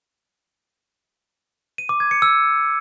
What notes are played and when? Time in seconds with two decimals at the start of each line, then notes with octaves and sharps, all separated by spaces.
1.78 D#7
1.89 D6
2.00 G#6
2.11 C#7
2.22 E6